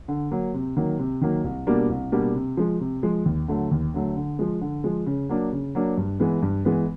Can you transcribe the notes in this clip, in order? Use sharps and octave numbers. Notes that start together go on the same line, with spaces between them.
D3
F#3 A#3
C3
D#3 F#3 A#3
C3
D#3 F#3 A#3
C2
B2 G3 A#3 D4
C2
B2 G3 A#3 D4
C3
F3 G#3
C3
F3 G#3
D#2
D3 F#3 A3
D#2
D3 F#3 A3
D3
F3 G#3
D3
F3 G#3
C#3
F#3 A#3 D4
C#3
F#3 A#3 D4
G2
E3 G#3 B3
G2
E3 G#3 B3